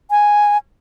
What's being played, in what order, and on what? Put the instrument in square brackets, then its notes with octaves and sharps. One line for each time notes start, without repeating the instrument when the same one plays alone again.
[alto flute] G#5